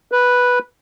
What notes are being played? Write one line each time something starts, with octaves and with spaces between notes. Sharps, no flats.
B4